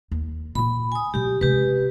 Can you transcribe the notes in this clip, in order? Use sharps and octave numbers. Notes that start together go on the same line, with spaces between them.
D#2
A#2 F4 B5
G#5 D#6
B2 F#3 G4
C3 G#3 G4 B4